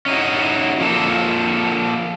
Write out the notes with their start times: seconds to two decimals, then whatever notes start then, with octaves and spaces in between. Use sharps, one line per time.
0.06 C#4 D#4 E4 F#4
0.81 F3 A#3 A4